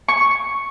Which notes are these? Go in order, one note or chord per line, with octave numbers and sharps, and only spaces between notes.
C#6